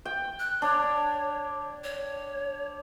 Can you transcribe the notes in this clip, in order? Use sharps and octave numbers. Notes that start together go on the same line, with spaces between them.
G5
F#6
D4 C#5
C#5